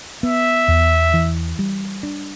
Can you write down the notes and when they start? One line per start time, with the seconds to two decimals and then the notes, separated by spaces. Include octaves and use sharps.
0.23 B3 E5
0.68 E2
1.13 E3
1.59 G3
2.03 D4